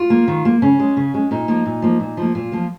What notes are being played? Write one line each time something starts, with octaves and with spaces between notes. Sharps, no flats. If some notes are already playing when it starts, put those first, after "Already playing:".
Already playing: F4
A#3
D#3
A#3
C#3 C#4
G#3
C#3
G#3
A#2 D#4
F3 A#3
A#2
F3 A#3
A#2
F3 A#3
A#2 F4
F3 A#3